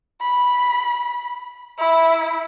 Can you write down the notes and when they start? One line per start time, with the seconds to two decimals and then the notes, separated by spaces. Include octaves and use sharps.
0.21 B5
1.79 E4